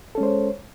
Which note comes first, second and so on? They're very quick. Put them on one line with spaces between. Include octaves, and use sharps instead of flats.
A4 C#4 G#3 C5 C#5